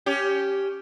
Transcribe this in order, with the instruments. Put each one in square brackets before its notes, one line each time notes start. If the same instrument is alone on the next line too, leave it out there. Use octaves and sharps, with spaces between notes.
[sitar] C#4 G4